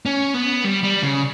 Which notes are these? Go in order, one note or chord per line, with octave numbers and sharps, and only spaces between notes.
C#4
B3
G3
G3
C#3